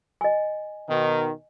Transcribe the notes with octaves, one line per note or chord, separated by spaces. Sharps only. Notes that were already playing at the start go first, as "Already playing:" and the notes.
D#5 G#5
B2 D#3